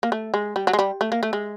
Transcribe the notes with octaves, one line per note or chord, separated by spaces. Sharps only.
A#3
A3
G#3
G3
F#3
G#3
G3
A3
A#3
A3
G#3